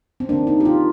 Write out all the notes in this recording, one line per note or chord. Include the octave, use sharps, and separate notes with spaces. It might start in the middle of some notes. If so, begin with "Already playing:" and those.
C4
D#3 A#3 D4
D#4
G4
F4